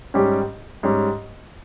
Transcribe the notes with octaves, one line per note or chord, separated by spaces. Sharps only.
G#2 G3 C#4 G4
G#2 G3 C#4 G4